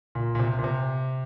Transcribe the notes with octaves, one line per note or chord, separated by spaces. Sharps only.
A#2
A#2
C3
A#2
C3